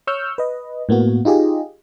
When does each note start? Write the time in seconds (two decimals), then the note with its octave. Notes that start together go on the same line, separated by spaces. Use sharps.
0.07 C#5 C#6 E6 F6 G6
0.38 B4 D#5
0.89 A2 A#3 B3 F#4
1.25 D#4 F4 G4 G#4 D#5